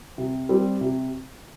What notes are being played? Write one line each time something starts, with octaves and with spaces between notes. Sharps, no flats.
C3
G3 C4
C3